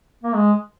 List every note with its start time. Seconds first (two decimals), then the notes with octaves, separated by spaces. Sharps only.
0.23 A#3
0.35 G#3